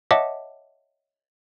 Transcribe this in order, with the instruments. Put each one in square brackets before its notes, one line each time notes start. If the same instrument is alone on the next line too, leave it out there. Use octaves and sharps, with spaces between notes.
[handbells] C#5 D#5 E5 F#5 A5 D6